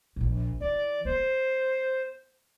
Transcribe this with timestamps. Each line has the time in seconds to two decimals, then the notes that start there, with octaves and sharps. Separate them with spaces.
0.16 A#1 A#2
0.61 E3 D5
1.05 B3 C5